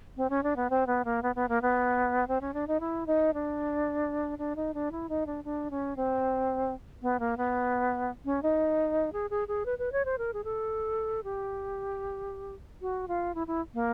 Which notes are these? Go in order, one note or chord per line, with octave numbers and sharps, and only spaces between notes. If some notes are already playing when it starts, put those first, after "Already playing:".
C4
C#4
D4
B3
C4
B3
A#3
B3
B3
A#3
B3
C4
C#4
D4
D#4
E4
D#4
D4
D4
D#4
D4
E4
D#4
D4
D4
C#4
C4
B3
A#3
B3
C#4
D#4
G#4
G#4
G#4
B4
B4
C#5
C5
A#4
G#4
A4
G4
F#4
F4
E4
E4
A#3